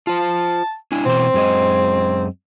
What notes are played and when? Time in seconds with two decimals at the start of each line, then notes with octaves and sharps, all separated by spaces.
0.07 F4 C5 A5
0.92 D4 E4 G#5
1.05 B2 E3 C4 C5
1.34 F#2 G#3 D#5